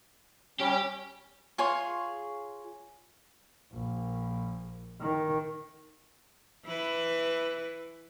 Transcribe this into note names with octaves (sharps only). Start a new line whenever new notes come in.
G3 C#4 G4
F4 G#4 C#5
A#1
D#3
E3 E4 B4